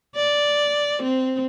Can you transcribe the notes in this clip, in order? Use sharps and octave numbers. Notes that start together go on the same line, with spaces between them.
D5
C4